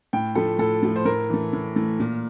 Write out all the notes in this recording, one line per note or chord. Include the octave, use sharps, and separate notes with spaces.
A2 G5
F3 A3 A4
A2 A4
F3 A3
C5
A2 A#4
E3 A3
A2
E3 A3
A#2